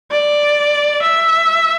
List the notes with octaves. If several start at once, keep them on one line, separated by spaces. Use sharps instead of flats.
D5
E5